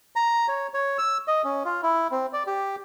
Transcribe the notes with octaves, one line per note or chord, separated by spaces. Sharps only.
A#5
C#5
C#5
E6
D#5
C#4
F4
E4
C4
D5
G4